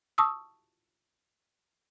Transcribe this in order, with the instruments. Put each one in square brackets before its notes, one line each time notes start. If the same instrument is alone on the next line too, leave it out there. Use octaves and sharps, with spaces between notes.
[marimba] A5 C#6 D#6 E6